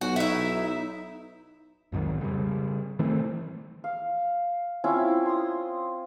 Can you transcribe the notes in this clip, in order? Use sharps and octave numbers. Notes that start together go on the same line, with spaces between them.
B1 F#4
D#4 E4 E5
B1 F2 G#2 D#3
C#3 G3
D#3 E3 A3 C4
F5
C4 C#4 E4 F4
C6 D#6